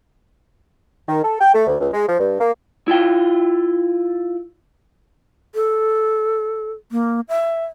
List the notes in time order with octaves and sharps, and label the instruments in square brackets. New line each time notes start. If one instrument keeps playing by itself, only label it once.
[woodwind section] D#3
A4
G5
A3
D2
C#2
G#3
F3
G2
A#3
[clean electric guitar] E4 F4 G5
[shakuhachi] A4
A#3
E5